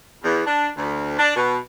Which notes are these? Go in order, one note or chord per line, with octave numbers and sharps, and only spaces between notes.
E2
D4
D2
D4
B2